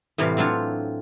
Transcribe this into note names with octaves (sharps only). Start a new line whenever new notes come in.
A2 C3 E3 G3 F5
F#3 C4 D4 F4 C#5